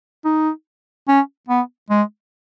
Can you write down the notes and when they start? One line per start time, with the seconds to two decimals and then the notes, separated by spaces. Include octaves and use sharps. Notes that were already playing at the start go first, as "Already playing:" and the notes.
0.25 D#4
1.08 C#4
1.49 B3
1.90 G#3